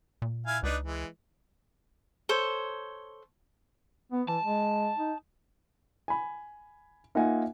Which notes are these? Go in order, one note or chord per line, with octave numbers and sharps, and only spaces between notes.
A#2
E4 F5 G#5
C#2 D4 D#4 B4
E3 G#3
A4 C5 C#5
B3
E3 A5
G#3
D#4
G#5 B5
A#3 D#4 F4 E5 F#5 G#5